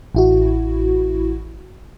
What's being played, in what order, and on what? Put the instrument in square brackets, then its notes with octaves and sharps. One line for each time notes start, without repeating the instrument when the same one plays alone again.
[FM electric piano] A1 E4 F#4